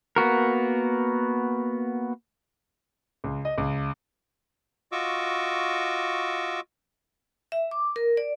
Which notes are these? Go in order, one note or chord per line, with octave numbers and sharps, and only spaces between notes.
A#3 B3 F#4 A#4
C#2
D#5
C#2
F4 F#4 D#5 C#6 D6 E6
E5
D6
A#4
D5